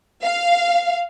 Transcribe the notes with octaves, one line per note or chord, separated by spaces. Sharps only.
F5